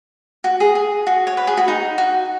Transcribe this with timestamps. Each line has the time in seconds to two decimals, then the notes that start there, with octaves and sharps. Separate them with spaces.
0.44 F#4
0.60 G#4
0.75 G#4
1.07 F#4
1.27 C#5
1.37 B4
1.47 G#4
1.57 F#4
1.68 D#4
1.98 F#4